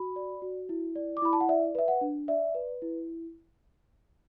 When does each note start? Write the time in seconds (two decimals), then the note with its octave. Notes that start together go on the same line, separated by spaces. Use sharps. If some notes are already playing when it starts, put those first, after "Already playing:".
Already playing: F#4 B5
0.16 D5
0.42 F#4
0.69 E4
0.95 D5
1.17 D6
1.22 E4 B5
1.33 A5
1.41 F#5
1.49 D5 E5
1.75 B4 E5
1.88 F#5
2.01 D4
2.28 D5 E5
2.55 B4
2.82 E4